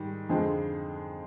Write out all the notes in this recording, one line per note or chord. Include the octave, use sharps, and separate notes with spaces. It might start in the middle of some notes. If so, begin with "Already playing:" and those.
Already playing: G#2 D#3 G3
F2 D3 G#3 C4